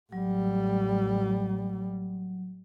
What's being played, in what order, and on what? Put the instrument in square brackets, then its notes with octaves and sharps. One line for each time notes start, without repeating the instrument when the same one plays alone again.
[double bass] A1 G3 [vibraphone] F#3